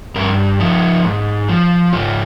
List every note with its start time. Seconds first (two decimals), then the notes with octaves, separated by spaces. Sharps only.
0.15 G2 A#4
0.60 F3 D#4
1.05 G#2
1.48 F3
1.93 G#2 F4